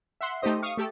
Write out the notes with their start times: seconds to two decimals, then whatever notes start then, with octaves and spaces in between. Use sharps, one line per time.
0.21 E5 F#5 C6
0.42 A3 D#4 G4 C5 D#5
0.62 F5 C#6 D#6
0.77 A3 G4 A4